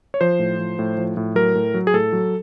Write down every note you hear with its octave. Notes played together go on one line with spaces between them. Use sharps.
C#5
F3 C5
A2
F3
A2
F3
A2
F#3 A#4
A2
F#3
G#4
A2 A4
F#3